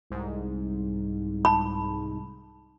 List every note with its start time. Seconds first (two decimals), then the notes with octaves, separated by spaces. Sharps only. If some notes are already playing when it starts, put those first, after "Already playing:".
0.10 C2 G#2
1.45 A5 B5